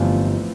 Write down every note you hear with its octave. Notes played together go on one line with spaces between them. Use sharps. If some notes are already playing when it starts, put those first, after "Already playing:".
Already playing: G1 E3 F3 A3 B3 C4